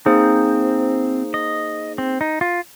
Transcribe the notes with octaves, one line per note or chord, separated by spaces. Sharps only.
A#3 C4 D#4 G#4 C5
D#5
C4
D#4
F4